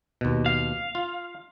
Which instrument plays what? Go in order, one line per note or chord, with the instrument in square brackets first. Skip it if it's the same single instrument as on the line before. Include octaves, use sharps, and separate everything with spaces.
[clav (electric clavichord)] D#2 B2
[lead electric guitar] F5
[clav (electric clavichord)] F4